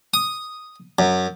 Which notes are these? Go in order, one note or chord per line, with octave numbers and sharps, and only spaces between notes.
D#6
F#2